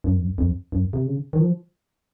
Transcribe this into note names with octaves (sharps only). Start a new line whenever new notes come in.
F#2
F2
F#2
F2
F#2
C3
C#3
D#3
F3